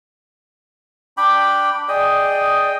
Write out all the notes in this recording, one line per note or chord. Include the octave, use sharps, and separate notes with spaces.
D4 G5 B5 D6
G#4 D5 D#5 G5